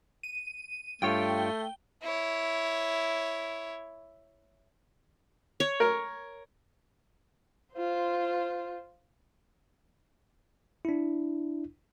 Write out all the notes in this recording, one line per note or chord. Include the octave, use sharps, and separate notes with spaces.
D#7
G2 A3 F4 C#5 G5
E4 C#5
C#5
A#4
F4 C5
D4 E4